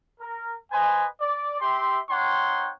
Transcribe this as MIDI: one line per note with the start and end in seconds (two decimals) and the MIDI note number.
0.20 0.55 70
0.71 1.06 71
0.71 1.06 72
0.71 1.06 75
0.71 1.06 80
1.20 1.58 74
1.61 2.00 67
1.61 2.00 76
1.61 2.00 84
2.10 2.70 60
2.10 2.70 63
2.10 2.70 73
2.10 2.70 78
2.10 2.70 79
2.10 2.70 84